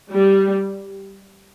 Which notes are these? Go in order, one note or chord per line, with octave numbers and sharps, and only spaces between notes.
G3